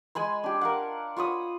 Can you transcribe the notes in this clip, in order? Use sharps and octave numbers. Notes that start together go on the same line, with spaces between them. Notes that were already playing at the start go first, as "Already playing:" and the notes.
G#3 G#5 B5 C6
D4 G4
A#4 F5 F#5
F4 C#5 B5 D#6